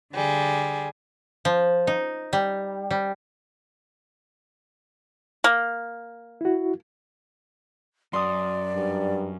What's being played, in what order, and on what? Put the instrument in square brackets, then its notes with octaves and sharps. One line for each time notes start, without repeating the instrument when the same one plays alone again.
[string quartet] D3 G3 G#4
[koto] F3
D#4
G3
G3
[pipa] A#3
[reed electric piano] E4 F#4
[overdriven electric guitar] F#2 [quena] D5 [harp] C6 D#6
[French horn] G2